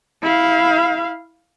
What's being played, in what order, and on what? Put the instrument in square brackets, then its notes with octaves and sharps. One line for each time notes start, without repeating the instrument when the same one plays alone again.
[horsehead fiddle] E4 F5